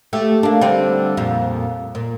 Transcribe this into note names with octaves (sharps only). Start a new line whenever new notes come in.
A3 G4
A#3 D4
D3 G3 C4
F2 A#2
A#2